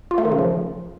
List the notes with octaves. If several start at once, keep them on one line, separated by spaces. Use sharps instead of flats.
F4
A3
D#3
C#3
F3